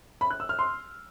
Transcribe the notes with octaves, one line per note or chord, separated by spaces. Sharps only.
B5
F#6
E6
F6
C6